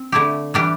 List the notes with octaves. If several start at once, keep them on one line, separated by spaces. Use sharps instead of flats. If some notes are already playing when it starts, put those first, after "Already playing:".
Already playing: C4
D3 A3 E4 G4
E3 G3 D4 G4